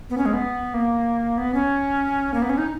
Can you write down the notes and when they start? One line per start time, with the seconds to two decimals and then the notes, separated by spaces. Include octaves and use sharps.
0.10 B3
0.18 C#4
0.26 G#3
0.33 B3
0.74 A#3
1.38 B3
1.54 C#4
2.34 A#3
2.42 B3
2.50 C#4
2.58 D#4